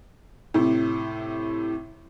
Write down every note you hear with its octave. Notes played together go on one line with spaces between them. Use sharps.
A2 C3